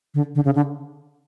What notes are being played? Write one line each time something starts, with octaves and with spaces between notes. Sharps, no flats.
D3
D3
C#3
D3